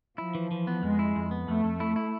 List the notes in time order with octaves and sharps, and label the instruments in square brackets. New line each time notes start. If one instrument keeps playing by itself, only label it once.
[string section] F3 [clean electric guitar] E4
[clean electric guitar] E3
E3
B3
[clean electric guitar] F2 [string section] G#3
[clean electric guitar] E4
F2
B3
[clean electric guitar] F2 [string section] A3
[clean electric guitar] F2
E4
E4